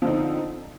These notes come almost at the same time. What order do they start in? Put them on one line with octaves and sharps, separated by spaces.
F3 D3 D#4 C4